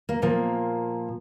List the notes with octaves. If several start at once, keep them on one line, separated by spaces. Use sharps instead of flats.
A#3
A#2 F3 A#3